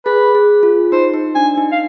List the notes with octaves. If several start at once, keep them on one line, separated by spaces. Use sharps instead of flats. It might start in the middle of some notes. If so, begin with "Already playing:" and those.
G#4 B4
G#4
F4
D#4 C5
D#4
D4 G#5
D#4
F5